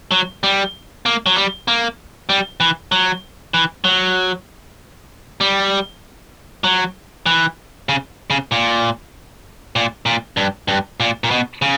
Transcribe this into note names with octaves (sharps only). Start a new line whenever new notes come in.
F#3
G3
A#3
F#3
G3
A#3
G3
E3
F#3
E3
F#3
G3
F#3
E3
C#3
C#3
A#2
A#2
A#2
G2
G2
A#2
A#2
B2
C#3